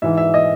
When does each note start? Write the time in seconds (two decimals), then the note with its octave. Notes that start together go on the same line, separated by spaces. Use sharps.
0.02 G#2 E3 E5
0.18 E5
0.34 D#5